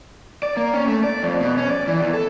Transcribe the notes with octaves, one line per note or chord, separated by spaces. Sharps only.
D5
A#3
C#4
A3
D5
F2
B2
C#4
D5
E3
E2
A4